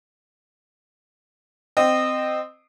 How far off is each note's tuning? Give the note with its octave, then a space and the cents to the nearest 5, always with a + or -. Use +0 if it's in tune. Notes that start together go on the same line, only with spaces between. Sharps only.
C4 -15 D#5 -20